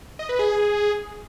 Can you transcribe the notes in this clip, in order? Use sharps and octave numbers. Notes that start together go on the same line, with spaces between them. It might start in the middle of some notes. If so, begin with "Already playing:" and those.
D#5
B4
G#4